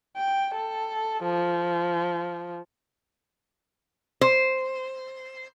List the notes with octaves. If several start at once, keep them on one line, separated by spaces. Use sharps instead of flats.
G5
A4
F3
C5